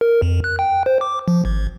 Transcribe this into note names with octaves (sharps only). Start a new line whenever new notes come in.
A#4
F2
F#6
G5
C5
D6
F3
G#1